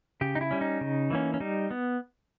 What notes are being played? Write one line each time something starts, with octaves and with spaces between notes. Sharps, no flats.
C#3 G4
D#4
E4
G3 C#4
D#4
C#3
E3 A#3 C#4
C#4
G3 D#4
B3